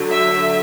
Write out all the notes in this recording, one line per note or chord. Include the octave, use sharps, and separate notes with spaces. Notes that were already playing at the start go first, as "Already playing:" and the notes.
Already playing: D3 F#3
E5